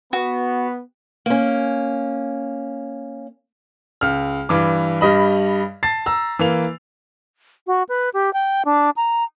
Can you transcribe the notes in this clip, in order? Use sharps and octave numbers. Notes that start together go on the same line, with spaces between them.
B3 F#4
A#3 C#4
C#2 F6
G2 E3 D6
G2 G3 D#5 B5
A5 A6 C7
A#5 E6
E3 A#3 F7
F#4
B4
G4
G5
D4
A#5